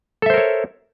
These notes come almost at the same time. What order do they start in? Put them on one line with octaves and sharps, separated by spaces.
A4 E5 C5 A#4 C#5